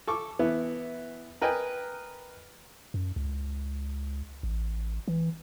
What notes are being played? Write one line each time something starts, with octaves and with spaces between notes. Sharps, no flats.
A4 C#6 D6
E3 B3 E4
A#4 B4 D#5 G5 G#5
F#2
C#2
A1
E3